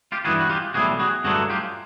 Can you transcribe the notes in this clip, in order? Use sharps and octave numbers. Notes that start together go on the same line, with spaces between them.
F4 G4
G2 E3 G3 F#4 G#4
F#4
F4 G4
B1 A2 E3 G3 F#4 G#4
F#4 G#4
G2 D3 F#3 A3 F#4 G#4
F4 G4